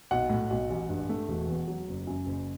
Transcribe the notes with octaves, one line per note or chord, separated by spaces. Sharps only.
B1 F#5
A2
B1
A1
G2
A3
E1
E2
F#3
F#1
F#2
F#1